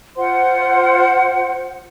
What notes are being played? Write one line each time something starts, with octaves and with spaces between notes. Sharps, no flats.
F4 C5 F#5 C6